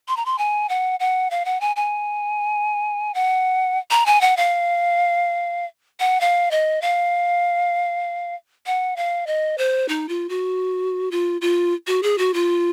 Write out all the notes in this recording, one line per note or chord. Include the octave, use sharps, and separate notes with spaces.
C6
A#5
C6
G#5
F#5
F#5
F5
F#5
G#5
G#5
F#5
A#5
G#5
F#5
F5
F#5
F5
D#5
F5
F#5
F5
D#5
C5
D#4
F4
F#4
F4
F4
F#4
G#4
F#4
F4